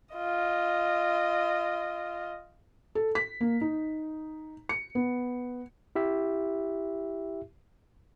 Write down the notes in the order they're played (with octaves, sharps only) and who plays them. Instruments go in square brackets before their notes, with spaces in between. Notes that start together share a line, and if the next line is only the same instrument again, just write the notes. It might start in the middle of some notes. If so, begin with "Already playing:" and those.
[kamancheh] F4 D#5
[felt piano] A4
B6
A#3
D#4
C#7
B3
[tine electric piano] E4 G4 E5